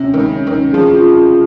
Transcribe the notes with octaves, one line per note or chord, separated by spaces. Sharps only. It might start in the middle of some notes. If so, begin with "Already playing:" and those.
Already playing: C3 C#4
D#3 G#3
C#3
C#4
D#3
C#4
F3 G#4
F4